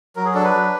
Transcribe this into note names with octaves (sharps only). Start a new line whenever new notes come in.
F#3 A#4
G#4
D4 A4
B4
F#3